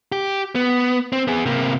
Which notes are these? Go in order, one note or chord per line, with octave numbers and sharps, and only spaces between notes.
G4
B3
C4
B3 G#4
C3 A#3